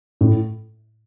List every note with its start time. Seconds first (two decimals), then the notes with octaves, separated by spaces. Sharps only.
0.21 A2